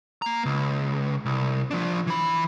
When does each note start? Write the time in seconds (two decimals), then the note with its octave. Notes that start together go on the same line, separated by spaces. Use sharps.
0.22 A#3 A#5
0.46 C#2
1.25 C2
1.71 F3 D4
2.07 E3 B5